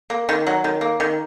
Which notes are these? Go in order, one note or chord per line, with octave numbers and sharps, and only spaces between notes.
A#3
D#3
F#3
D#3
A#3
D#3